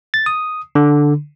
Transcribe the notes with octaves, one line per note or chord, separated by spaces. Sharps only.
A6
D#6
D3